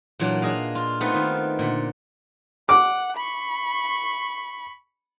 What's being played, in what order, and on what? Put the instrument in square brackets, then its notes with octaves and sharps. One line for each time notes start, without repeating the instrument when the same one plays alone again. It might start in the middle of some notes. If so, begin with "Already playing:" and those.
[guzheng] A#2 E3 F#3 D4
D4 G#4 D#5 F5
F4
A3 B3 C4 D#4 F4 B4
D#3
A#2 D3
[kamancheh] F#5 [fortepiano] D6
[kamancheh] B5 C#6